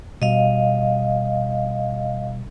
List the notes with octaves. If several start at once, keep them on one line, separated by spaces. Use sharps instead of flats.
B2 G3 D#5 F5